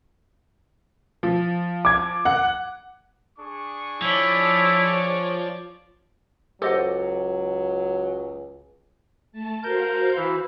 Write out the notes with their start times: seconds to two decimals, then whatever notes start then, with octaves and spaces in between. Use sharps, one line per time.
1.23 F3
1.85 D6 G#6
2.25 F#5 F#6
3.38 D4 G#4 C#6
4.02 F3 E4 C#5 D5
6.62 C#2 F#3 G4 A4 C5 D#5 F#5
9.32 A3 A5
9.63 F#4 A#4 C5 F5 G6
10.16 E3 E4